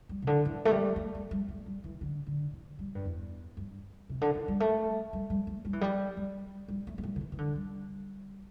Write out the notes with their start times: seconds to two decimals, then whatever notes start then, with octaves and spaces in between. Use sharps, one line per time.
0.09 G3
0.22 C3
0.27 D3
0.45 E3
0.65 A3
0.71 G3
0.96 A3
1.15 G3
1.31 G3
1.48 A3
1.66 G3
1.84 E3
2.01 D3
2.27 D3
2.53 E3
2.79 G3
2.95 G2
3.05 E2
3.57 G2
4.09 C3
4.21 D3
4.35 E3
4.48 G3
4.60 A3
5.13 G3
5.30 G3
5.47 A3
5.65 G3
5.73 E3
5.81 G3
6.17 G3
6.68 G3
6.87 A3
6.98 A3
7.03 G3
7.16 D3
7.21 E3
7.32 E3
7.38 D3
7.56 G3